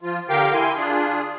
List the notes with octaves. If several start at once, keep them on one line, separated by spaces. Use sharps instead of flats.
F3 F4
D3 G4 A#4 F5 G5
E4 G#5 C6
D4 F4 G#4